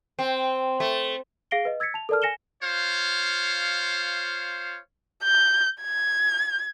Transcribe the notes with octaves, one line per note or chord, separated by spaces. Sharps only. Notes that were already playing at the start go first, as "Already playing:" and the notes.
C4
A3
G#4 F5 A#6 C7 D7 G7
B4 D#5
E6 G#6 A6 B6 C#7
A5 F7
A4 A#4 D5 A5 F6
G#5 A#6 C#7 E7 G7
F4 C5 C#5 F5
G6
G#6